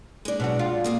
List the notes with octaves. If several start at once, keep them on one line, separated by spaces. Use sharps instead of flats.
G#3 D4
B2 F#3 F#4
F4
A#3 G#4 F5